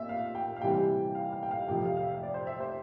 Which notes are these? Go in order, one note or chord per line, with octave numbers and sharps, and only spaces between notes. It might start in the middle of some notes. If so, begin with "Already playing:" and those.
Already playing: A#2 C4 E5
F5
G5
F5
C3 E3 G3 C4 G5
F5
F5
G5
F5
F2 C3 F3 G5
F5
F5
E5
D5
C5
E5
C5